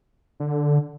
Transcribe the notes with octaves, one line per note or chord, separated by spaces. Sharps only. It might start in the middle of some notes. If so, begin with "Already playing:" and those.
D3